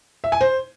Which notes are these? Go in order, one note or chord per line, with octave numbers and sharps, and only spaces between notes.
E5
G#5
C5